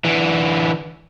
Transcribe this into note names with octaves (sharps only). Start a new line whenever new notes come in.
D3 E3